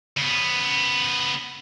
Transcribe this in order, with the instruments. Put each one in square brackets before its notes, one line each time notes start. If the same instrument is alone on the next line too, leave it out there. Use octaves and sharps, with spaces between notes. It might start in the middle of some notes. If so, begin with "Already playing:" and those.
[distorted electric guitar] C#3 B3